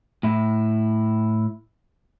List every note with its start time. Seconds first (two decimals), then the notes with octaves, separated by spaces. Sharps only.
0.23 A2 E4